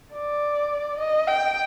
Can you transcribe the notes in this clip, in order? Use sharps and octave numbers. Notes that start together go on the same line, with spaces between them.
D5
D#5
G5